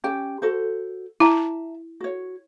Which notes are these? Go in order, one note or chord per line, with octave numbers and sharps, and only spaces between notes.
C#4 G4 G5
F#4 A4 C5
E4 E5 A5 A#5
F#4 C#5